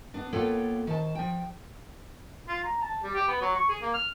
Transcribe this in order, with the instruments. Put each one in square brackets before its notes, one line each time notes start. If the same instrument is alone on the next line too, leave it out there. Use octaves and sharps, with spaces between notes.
[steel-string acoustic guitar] B3 D4
A#3 B3 F4 A4 C#5 G5
D#3 C5 A5
F3 G5
[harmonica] F4
A#5
A5
G3
G4
B3
F#3
C#6
G#4
A#3
F6